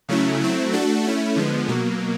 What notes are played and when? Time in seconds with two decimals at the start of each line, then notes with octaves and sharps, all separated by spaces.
0.09 C#3 F#3 A3 C#4 E4
0.40 F#3 A3 C4 E4
0.72 A3 D4 F#4 A4
1.04 A3 C#4 E4
1.36 D3 F3 G#3 B3
1.68 B2 F#3 A#3